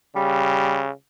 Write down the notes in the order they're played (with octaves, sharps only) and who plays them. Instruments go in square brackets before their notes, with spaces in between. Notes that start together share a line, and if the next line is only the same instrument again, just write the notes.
[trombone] C#3 [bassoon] G3